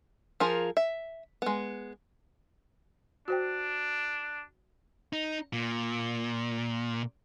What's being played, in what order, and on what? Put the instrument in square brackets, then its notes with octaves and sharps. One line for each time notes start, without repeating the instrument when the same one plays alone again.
[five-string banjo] F3 F4 G#4 A#4
E5
G#3 B3
[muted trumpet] D4 [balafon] F#4 C5 G5
[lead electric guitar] D#4
A#2